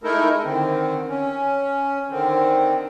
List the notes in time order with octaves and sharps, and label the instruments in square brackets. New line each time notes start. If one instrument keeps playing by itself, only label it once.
[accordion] G#3 A3 D#4 E4 A4 A#4
D3 D#3 C4
C#4
D3 D#3 C4